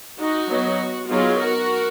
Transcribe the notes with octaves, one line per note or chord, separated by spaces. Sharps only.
D#4 F#4
F#3 B3 D#4
F#3 B3 D#4 F4 G#4
F#4 A#4